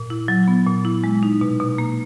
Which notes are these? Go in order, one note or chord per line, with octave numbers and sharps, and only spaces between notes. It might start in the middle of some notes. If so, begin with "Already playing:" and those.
Already playing: A#2
E4
F#3
B3
A#2
E4
G#3
D#4
B2
B2
A#3